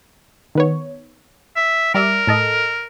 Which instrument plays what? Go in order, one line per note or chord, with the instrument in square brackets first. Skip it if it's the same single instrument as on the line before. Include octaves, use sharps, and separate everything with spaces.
[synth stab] D#3 B3 C#5
[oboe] E5
[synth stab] G3 D5 E5 [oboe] A#4
[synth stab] A2 A4 D#5